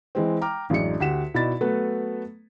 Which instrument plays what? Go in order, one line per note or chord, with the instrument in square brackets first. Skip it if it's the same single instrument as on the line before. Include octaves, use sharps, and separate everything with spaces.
[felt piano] E3 G#3 C4
G5 A#5 D6 F6
A1 F#2 G#3 D4 C#7
D2 G4 F#5 B6 E7
B2 D#4 E4 D5 B5 A6
F#3 A3 B3 A4 B4